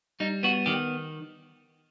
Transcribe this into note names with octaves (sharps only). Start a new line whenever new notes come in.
G3 D#4
B3 F#4
D#3 G4